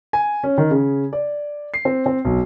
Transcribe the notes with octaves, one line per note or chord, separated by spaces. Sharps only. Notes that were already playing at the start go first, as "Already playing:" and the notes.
G#5
C#4
D#3
C#3
D5
C7
C4
C4
B1